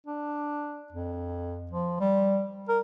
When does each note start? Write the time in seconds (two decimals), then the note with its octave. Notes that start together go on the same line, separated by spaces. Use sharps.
0.07 D4
0.92 F2
1.72 F3
2.00 G3
2.69 A#4